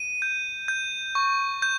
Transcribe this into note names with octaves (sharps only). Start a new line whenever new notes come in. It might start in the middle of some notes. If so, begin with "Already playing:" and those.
Already playing: D#7
G6
G6
C#6
G6